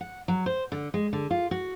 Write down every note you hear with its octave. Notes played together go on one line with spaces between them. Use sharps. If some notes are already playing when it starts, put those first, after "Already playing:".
F#5
F#3
C5
D3
G#3
D3
F4
F#4